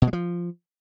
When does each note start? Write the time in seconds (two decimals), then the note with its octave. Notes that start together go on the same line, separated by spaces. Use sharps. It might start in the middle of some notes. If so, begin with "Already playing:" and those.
0.02 B2
0.07 G#3
0.13 F3